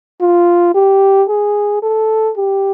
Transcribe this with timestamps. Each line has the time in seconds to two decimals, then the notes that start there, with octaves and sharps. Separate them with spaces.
0.21 F4
0.75 G4
1.29 G#4
1.82 A4
2.37 G4